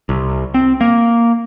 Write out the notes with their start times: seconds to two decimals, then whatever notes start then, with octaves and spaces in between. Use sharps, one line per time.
0.09 C2
0.54 C4
0.81 A#3